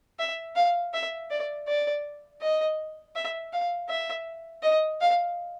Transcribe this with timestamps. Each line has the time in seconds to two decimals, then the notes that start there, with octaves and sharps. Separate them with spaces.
0.19 E5
0.56 F5
0.93 E5
1.30 D5
1.67 D5
2.41 D#5
3.15 E5
3.53 F5
3.89 E5
4.63 D#5
5.01 F5